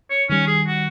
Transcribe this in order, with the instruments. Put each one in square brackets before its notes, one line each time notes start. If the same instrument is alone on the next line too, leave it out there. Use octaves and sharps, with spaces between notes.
[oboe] C#5
[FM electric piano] D#3 G3 [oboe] C#4
[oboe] G#4
F#4